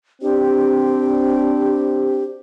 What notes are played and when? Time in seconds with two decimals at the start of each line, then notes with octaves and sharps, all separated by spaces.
0.22 C4 D4 G4